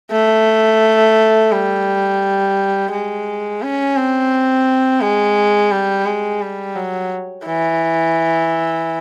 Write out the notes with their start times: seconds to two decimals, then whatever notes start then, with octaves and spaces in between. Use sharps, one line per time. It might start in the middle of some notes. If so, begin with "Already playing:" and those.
0.12 A3
1.52 G3
2.92 G#3
3.62 C#4
3.96 C4
5.01 G#3
5.71 G3
6.06 G#3
6.42 G3
6.76 F#3
7.46 E3